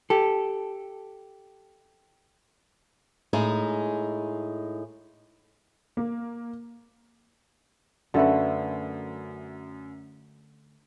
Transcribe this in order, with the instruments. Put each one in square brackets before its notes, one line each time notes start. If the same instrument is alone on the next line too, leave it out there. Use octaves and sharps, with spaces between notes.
[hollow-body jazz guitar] G4 A4
[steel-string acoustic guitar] A2 G#3 D#4 G#4
[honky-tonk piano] A#3
[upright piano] F#2 [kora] D3 A3 B4